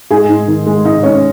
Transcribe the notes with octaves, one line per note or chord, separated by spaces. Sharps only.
G#2 G#4 G#5
G#2
D#3
G#3
G#2 D#4 D#5
G#2 C#4 C#5